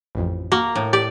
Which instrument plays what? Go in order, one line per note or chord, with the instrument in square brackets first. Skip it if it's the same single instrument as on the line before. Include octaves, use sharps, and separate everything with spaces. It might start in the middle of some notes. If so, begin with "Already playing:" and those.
[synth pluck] A1 F2
[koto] A#3 [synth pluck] F#4
[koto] A2
[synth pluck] G4 [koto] D5